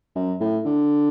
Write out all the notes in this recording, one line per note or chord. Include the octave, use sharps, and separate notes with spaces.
F#2
A2
D3